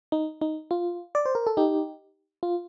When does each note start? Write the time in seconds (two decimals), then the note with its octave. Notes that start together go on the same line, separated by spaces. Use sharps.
0.12 D#4
0.41 D#4
0.71 F4
1.15 D5
1.26 C5
1.35 A#4
1.47 A4
1.57 D#4 G4
2.43 F4